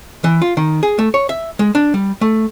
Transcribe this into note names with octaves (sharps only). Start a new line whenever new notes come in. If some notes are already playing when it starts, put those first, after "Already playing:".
E3
F4
D#3
G#4
A3
C#5
E5
G#3
D4
G3
A3